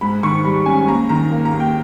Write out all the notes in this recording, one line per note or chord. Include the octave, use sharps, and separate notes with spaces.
G#2 B5
D#3 C#6
G3 B5
C#4 G#5
D#2 A#5
D#3 A#5
A#3
A#5
D#2
G5